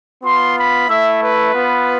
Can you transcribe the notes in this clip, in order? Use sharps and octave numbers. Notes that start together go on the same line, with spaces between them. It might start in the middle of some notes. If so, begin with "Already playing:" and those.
B3 F4 C6
B5
A3 E4 E5
B4
B3 F4